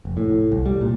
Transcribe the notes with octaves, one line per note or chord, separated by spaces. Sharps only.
F1
A2
C2
G3
A#2